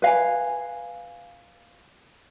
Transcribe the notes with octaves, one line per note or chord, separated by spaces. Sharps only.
B4 F5 G#5